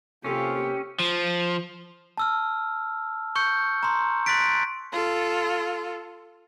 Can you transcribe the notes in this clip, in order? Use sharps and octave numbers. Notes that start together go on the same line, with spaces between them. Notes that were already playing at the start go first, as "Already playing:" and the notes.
C3 A#3 C#4 F4 G4 A4
F3
A5 E6 F6
C#6 G6 C#7
A#5 C6
C6 F#6 A6 B6 D7
F4 A4